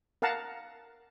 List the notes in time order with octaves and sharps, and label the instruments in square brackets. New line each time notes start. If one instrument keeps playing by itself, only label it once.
[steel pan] A#4 F5 F#5 A5 A#5